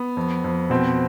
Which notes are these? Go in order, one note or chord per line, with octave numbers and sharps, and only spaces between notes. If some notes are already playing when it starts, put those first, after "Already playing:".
Already playing: B3
F2
F2
B2 C4